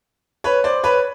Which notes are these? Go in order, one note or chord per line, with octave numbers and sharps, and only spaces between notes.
B4 C#5
C5 D5
B4 C#5